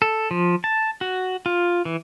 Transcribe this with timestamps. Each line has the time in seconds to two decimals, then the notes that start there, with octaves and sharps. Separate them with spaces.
0.02 A4
0.31 F3
0.64 A5
1.01 F#4
1.46 F4
1.85 E3